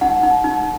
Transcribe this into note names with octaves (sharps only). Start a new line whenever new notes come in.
D#4 F#5
D#4
D#4